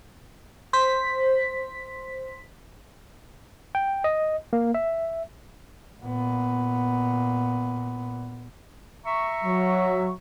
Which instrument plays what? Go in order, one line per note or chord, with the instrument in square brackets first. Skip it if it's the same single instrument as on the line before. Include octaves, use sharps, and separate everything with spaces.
[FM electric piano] C5 B6
[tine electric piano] G5
D#5
A#3
E5
[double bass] A#2 B3
[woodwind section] E5 A#5 C#6
[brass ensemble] F#3